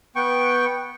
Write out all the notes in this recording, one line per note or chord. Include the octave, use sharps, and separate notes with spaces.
B3 G5 C#6